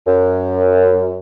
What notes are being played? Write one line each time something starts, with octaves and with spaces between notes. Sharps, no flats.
F#2